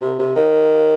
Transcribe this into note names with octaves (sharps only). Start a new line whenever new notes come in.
C3
C3
D#3